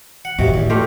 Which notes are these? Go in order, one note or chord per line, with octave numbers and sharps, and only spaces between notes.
F#5
D#2 A2 C3 F#4
E2
B2 A3 F4 G4